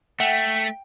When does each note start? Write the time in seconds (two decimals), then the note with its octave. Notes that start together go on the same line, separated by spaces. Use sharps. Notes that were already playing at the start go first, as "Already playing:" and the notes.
0.20 A3 E5 F#5 G5 B6